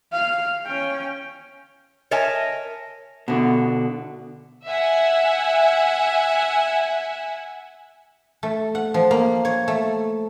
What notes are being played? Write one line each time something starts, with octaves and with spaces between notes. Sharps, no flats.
F5
C#4 G5
A#4 C#5 D#5 E5 G#5 A5
B2 D3
E5 F#5 G#5
A3
F#5
F3
A#3
C#5
A3